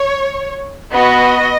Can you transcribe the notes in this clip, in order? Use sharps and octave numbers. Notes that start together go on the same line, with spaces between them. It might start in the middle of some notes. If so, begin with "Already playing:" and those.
Already playing: C#5
B3 F#4 D#5